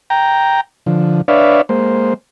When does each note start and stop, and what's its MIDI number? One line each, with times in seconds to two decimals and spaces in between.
0.10 0.61 79
0.10 0.61 82
0.86 1.21 50
0.86 1.21 53
1.28 1.61 62
1.28 1.61 71
1.28 1.61 73
1.28 1.61 74
1.28 1.61 76
1.28 1.61 77
1.69 2.14 56
1.69 2.14 58
1.69 2.14 72